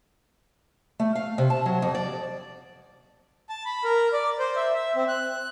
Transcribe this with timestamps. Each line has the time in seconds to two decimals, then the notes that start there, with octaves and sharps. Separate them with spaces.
1.00 A3
1.15 F5
1.38 C3
1.50 A5
1.66 F#3
1.82 F2
1.95 D5
3.49 A5
3.65 B5
3.84 A#4
4.13 D5
4.39 C5
4.56 E5
4.75 E5
4.96 C4
5.08 F#6